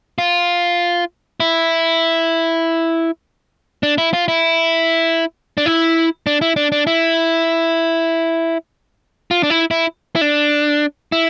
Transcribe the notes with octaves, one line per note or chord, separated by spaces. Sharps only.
F4
E4
D4
E4
F4
E4
D4
E4
D4
E4
D4
D4
E4
F4
D4
E4
E4
E4
D4
E4